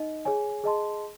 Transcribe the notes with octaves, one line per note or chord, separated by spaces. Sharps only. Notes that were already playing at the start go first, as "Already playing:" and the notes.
Already playing: D#4 D#5
G#4 C#5 G#5
G#4 D#5 A5 C6